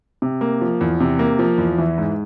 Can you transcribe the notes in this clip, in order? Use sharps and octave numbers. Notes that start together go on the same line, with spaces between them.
C3
A#3
F3
E2
C3
A#3
F3
E2
E3
G#2